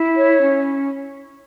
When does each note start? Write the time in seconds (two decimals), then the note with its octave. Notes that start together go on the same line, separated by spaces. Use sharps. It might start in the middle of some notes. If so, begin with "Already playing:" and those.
Already playing: E4
0.16 C#5
0.41 C#4